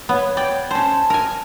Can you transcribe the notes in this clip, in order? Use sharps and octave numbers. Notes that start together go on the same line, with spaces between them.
B3 C#5
D5 G5
C#4 C5 A5
A#4 G#5